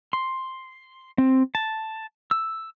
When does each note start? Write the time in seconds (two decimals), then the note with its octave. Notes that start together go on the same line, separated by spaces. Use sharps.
0.13 C6
1.18 C4
1.55 A5
2.31 E6